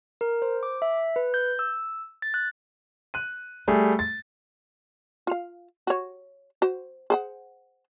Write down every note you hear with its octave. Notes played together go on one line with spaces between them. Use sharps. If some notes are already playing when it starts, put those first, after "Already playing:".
A#4
C5
D6
E5
B4
G6
E6
A6
F#6
F#6 D#7
G3 A3 G#4
A6
F4 F5
F#4 C#5
F#4 C5
G#4 C5 F#5